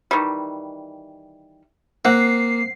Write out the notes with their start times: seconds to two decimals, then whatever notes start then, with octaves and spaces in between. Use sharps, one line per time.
0.11 D#3 E3 G3
2.05 A#3 C4 F#5 C7